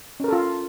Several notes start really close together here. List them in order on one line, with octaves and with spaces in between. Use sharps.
C#4 A#4 A4 F4